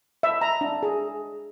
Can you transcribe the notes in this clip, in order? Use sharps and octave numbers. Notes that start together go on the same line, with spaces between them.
E5
A#5
D4
G#4